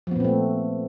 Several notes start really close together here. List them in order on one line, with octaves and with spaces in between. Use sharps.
F3 B3 A#2 C4 A3